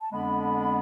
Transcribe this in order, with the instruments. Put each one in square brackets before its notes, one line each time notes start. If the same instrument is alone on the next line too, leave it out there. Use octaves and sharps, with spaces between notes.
[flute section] A5
[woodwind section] F2 D3 G#3 B3 D4 [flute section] B5